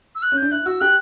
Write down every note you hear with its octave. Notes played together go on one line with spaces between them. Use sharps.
E6
F#6
C#4
G6
D4
E4 F#6
F#4 E6
G4 F#6